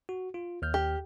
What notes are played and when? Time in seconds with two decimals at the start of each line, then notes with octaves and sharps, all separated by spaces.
0.09 F#4
0.34 F4
0.62 D#2 F6 G6
0.74 G4